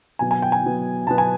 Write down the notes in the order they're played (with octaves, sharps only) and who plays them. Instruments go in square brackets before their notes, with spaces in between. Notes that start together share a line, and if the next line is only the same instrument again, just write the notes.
[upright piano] B2 F#3 B3 G#5
G#5
G5
G#5
B2 F#3 B3
B2 F#3 B3 A5
G#5